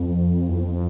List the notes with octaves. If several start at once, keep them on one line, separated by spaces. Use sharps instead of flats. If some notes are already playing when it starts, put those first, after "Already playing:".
Already playing: F2
E2
F2